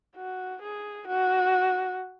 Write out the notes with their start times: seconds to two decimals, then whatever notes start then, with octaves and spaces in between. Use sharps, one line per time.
0.16 F#4
0.62 G#4
1.08 F#4